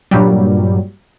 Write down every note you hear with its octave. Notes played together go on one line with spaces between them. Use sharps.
G2 A#2 F#3 G3